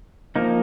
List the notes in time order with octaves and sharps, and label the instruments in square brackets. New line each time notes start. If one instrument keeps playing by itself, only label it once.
[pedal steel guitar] F3 A#3 D#4